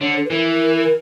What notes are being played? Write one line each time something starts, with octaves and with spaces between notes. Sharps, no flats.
D3 C#5
A4
B4
E3 A#4